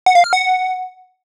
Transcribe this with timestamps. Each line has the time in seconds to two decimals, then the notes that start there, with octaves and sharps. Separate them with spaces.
0.06 F#5
0.15 F5
0.24 F6
0.33 F#5